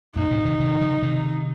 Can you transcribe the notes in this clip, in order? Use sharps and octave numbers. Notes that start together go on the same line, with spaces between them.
F#2 A#2 D#4
A2 C3
C3 D#3
C3 D#3
C#3 F3
C3 D#3